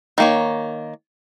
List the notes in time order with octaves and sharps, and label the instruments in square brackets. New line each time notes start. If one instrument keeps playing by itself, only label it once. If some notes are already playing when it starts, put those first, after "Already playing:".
[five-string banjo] D#3 A#3 C#5